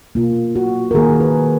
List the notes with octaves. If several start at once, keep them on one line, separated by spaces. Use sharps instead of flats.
B2 A#3 F4
F#4
A#4
D#3 A#3 G#4
B4